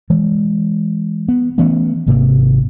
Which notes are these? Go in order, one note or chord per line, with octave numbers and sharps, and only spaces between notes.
E3 G#3
B3
E3 A3 B3 C#4
G#1 G#2 C3 A#3